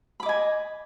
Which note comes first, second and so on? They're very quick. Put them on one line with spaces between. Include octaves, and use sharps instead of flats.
B5 D6 D#5 G#5